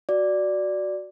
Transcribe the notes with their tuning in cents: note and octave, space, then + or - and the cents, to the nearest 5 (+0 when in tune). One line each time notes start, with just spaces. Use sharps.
F#4 +0 D5 +0